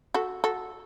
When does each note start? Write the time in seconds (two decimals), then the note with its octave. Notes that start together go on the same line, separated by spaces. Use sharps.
0.14 F#4 A4
0.44 F#4 A4